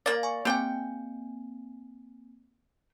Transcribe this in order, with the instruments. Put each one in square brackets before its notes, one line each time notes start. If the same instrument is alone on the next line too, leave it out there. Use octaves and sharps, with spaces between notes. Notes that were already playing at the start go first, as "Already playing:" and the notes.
[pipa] A#3 D5 [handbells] F5 A6
[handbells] G#5 C#6
[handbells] A#3 C4 G#5 [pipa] G4 G5